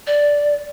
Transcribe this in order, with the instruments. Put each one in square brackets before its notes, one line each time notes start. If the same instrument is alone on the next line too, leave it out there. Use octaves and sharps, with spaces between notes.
[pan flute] D5